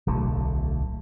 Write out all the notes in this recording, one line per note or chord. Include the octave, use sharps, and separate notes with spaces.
D1 B1 D3 A3